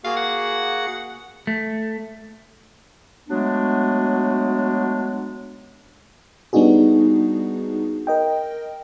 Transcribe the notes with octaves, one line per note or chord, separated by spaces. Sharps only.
A#3 F#4 G#4 F5
F#5
A3
F#3 G#3 A3 B3 D4
G3 B3 D4 D#4 F#4 G#4
A#4 D#5 G5